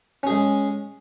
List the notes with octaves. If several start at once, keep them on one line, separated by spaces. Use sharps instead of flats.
G#3 C#4 G#4